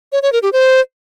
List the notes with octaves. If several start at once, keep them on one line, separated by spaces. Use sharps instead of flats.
C#5
C#5
A#4
G4
C5